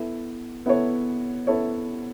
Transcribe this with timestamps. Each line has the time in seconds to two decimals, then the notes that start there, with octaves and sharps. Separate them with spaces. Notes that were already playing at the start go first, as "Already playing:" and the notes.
Already playing: B3 E4 A4
0.66 B3 E4 A4 C#5
1.47 B3 E4 A4 C#5